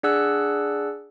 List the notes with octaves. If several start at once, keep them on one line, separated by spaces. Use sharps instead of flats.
D4 G#4 D5 F#5 E6 F#6